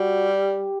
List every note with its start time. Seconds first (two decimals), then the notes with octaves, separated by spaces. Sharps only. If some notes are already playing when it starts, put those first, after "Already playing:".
Already playing: G3 F#4
0.37 G4